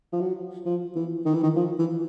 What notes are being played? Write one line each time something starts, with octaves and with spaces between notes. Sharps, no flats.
F3
F#3
F3
E3
D#3
E3
D#3
F3
E3